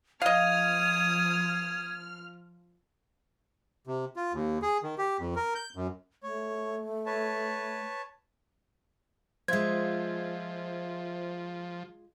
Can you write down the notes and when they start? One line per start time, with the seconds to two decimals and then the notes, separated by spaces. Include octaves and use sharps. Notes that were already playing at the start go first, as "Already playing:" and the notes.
0.22 F3 D#5 F5 D#6 F6 G#6
3.87 C3
4.16 F4
4.33 D#2
4.62 G#4
4.83 D#3
4.98 G4
5.20 F2
5.36 A#4
5.55 G6
5.75 F#2
6.23 A3 C#5
7.06 B4 C#5 A5
9.48 F3 G#3 F4 C5 E5 G#6